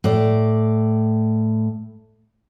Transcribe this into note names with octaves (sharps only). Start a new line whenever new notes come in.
A2 D5